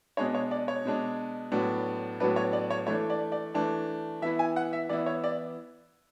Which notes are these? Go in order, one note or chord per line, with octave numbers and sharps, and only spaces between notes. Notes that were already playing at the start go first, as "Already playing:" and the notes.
B2 G#3 D4 C#5
C#5
D5
C#5
B2 G#3 D4
A2 F#3 B3 D4
A2 F#3 B3 D4 B4
C#5
D5
C#5
E3 A3 D4 C#5
D5
D5
E3 A3 D4
E3 B3 E4 E5
G#5
F#5
E5
E3 B3 E4 D5
C#5
D5